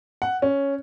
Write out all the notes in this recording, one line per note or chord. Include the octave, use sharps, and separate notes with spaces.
F#5
C#4